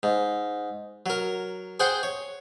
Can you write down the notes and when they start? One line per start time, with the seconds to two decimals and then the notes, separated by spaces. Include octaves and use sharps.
0.03 G#2
1.06 F#3 A#4
1.80 G#4 C5 F#5 G5
2.03 C#5